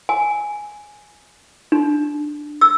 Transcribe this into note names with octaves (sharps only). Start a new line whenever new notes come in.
G#5
D4
E6